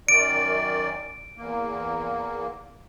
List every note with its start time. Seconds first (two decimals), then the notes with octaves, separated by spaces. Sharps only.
0.08 F#2 D#3 D5 D7
1.37 E2 A#3